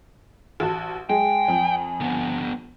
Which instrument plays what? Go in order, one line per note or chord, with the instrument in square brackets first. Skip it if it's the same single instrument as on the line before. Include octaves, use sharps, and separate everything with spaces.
[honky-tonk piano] A1 F#4 A5
[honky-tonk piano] G#3 [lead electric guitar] G5 [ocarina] G#5
[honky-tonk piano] F2
[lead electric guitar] D3 B3